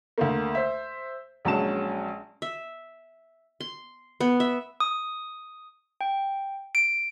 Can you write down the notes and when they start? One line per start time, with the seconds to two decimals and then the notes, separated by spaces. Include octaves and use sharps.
0.18 D2 A3 A#3
0.55 C5 E5
1.45 A#1 F#3 G#3 C#4 A5 E7
2.42 E5
3.61 C6
4.20 B3
4.40 E5
4.80 D#6
6.01 G5
6.75 D7